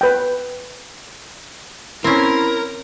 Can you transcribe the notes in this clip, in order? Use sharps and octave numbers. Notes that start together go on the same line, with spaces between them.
B4 G5
C4 C#4 E4 A#4